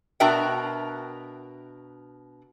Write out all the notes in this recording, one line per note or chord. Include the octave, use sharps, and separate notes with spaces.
B2 D4 F#4 A#4 E5 G5